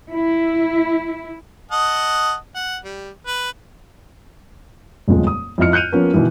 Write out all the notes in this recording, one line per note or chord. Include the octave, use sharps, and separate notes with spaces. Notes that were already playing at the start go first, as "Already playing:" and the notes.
E4
D#5 F#5 A5
F#5
G3
B4
D#1 F2 A#2 C#3 G#3
D#6
F2 E4 F4 D#5 F6 C#7
F#6 G6 C#7 D#7 F7
F3 A#3 B3 C#4 A#4
B2 D#3 E3 E4